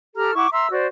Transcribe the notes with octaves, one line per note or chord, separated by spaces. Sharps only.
G4 A4 A#5 F6
E4 F#5 C#6 D6
E5 A#5 C6 E6
F#4 C5 D5